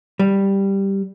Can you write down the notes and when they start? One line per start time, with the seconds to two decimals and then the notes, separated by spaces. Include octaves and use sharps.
0.19 G3